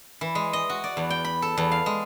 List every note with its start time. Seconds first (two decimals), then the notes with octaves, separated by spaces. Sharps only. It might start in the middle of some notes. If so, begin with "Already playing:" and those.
0.21 E3
0.35 G#3
0.53 D#5
0.70 F#4
0.84 D5
0.97 E2
1.10 G5
1.24 B5
1.42 A4
1.57 E2
1.72 F5
1.86 G#3